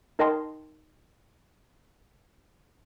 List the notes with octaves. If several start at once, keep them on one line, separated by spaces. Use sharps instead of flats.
D#4 A#4 D#5 G5 A5 C6